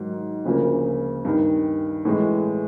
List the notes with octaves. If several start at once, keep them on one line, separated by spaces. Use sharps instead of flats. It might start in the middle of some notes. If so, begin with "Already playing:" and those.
Already playing: G#2 D#3 F#3
D2 C#3 F3 A#3
G2 D#3 G3
A2 E3 G#3